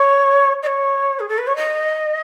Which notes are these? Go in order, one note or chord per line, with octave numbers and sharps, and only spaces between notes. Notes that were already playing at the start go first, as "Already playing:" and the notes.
Already playing: C#5
D#5
C#5
G#4
A4
B4
C#5
D#5